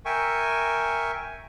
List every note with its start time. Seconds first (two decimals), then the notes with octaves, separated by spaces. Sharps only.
0.05 A#4 E5 G5 G#5 C#6